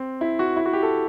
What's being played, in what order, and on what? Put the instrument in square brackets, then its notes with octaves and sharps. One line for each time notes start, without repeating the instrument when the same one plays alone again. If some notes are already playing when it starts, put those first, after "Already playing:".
Already playing: [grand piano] C4
E4
F#4
E4
F#4
G4
A4